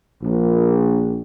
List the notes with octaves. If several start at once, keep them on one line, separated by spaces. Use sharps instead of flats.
A#1